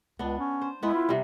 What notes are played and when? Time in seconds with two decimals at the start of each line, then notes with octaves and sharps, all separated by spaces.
0.19 C#2 B3 D4
0.39 C#4
0.62 C5
0.83 G#3 B3 E4 B4
0.95 F4
1.09 C3 G3